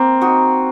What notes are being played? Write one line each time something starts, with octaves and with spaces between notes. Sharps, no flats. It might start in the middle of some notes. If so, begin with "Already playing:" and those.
Already playing: A#3 C4
D#4 F#4